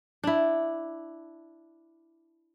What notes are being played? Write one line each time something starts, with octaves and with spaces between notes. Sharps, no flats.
D4 E4